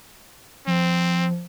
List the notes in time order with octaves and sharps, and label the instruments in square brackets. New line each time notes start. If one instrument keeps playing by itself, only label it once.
[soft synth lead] F3 [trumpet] C4